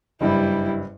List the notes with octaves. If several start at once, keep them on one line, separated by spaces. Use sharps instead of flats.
F#1 G2 G3 E4